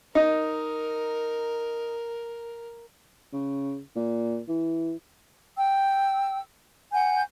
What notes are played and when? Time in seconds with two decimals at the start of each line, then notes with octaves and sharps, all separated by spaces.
0.15 D#4 A#4
3.33 C#3
3.96 A#2
4.48 E3
5.56 G5 E6
6.93 F#5 G#5 G6